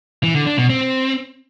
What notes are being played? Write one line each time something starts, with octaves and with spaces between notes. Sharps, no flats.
E3
D3
D4
B2
C4